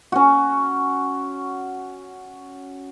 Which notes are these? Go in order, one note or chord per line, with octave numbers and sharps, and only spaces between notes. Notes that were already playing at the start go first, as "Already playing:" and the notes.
C#4 F#4